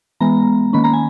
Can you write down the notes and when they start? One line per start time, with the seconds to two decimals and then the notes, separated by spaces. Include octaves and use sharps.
0.20 E3 G#3 B3 A#5
0.73 D#3 A#3 C#4 B5
0.84 A#5
0.93 G#5